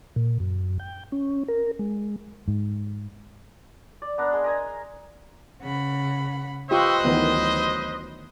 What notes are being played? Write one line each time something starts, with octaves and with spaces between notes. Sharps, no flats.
A#2
F#2
G5
C#4
A#4
G#3
G#2
D5
B3 D4 A#4
G#3 C6
A#4 D#5 G#5
C#3 F#5 B5
F4 G4 B4 C5 D#5 C#6 E6 F#6
D2 D#3 E3 F#3 B3